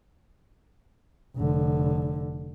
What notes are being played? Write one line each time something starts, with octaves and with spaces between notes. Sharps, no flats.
F1 D3